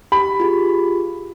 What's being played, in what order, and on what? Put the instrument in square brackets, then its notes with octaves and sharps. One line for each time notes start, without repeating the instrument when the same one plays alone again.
[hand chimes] G4 [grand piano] B5
[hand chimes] F4 G4 G#4